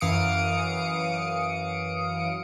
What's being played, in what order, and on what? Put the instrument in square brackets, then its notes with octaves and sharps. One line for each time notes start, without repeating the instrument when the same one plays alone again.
[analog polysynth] F#2 E3 F5 D#6 C#7 D7